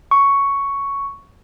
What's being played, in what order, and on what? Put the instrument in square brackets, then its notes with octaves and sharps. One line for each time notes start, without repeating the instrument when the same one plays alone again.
[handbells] C#6